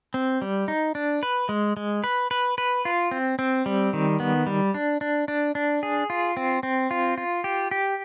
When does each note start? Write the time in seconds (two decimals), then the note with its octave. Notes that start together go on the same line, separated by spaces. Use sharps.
0.14 C4
0.42 G3
0.68 D#4
0.95 D4
1.23 B4
1.49 G#3
1.77 G#3
2.04 B4
2.31 B4
2.58 B4
2.85 F4
3.11 C4
3.39 C4
3.66 G3
3.93 D#3
4.20 B3
4.47 G3
4.74 D4
5.01 D4
5.28 D4
5.55 D4
5.83 G#4
6.10 F4
6.37 C4
6.63 C4
6.91 F4
7.18 F4
7.44 G4
7.71 G4